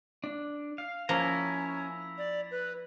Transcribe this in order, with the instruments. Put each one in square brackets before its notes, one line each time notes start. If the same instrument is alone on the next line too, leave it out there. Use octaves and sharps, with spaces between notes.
[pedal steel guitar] D4
F5
[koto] F3 A#3 [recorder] C#4 [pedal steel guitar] E4 A#5
[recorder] D5
B4